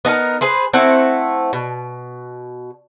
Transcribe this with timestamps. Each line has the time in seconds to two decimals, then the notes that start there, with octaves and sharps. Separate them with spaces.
0.05 B3 D#4 G#4 A#4
0.41 G#4 B4 C5
0.73 A3 C4 E4 F#5
1.53 B2